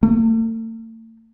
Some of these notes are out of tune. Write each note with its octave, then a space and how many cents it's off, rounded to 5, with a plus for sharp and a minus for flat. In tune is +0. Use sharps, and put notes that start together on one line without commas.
A3 +45